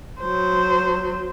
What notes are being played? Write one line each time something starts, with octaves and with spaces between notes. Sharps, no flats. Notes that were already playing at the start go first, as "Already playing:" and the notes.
F#3 C5